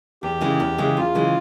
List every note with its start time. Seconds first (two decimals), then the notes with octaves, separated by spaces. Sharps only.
0.23 E2 G4
0.41 C#3 E3 G#3
0.60 E2
0.78 C#3 E3 G#3
0.97 E2 F4
1.15 C#3 E3 G#3